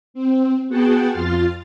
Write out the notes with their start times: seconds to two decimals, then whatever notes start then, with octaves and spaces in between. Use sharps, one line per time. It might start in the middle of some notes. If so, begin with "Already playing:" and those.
0.14 C4
0.68 B3 F#4 G#4 F#5 G5 A5
1.10 F2 F4 C6 F6 A6